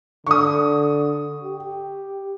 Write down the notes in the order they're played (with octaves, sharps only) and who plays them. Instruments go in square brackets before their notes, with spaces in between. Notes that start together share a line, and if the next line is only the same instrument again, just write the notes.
[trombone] D3 [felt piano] C#6 D#6
[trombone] G4